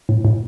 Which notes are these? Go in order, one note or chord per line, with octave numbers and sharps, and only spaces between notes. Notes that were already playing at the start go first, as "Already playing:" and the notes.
A2
A2